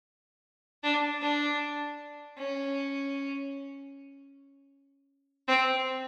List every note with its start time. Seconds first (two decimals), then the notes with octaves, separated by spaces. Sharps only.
0.83 D4
1.21 D4
2.38 C#4
5.48 C4